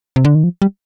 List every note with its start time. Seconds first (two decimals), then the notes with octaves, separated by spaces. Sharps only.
0.16 C3
0.25 D3
0.35 D#3
0.44 F3
0.62 G3